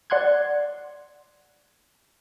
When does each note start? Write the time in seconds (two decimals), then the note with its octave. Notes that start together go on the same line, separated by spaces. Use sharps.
0.10 D5 F#5 C6 F#6 G#6